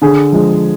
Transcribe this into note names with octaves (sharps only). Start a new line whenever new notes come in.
D3 G#4
F3 G#3